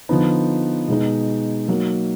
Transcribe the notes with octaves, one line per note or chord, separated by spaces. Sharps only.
D3 F3 B3 D#4
B2 G#3 D#4
F#3 A#3 D#4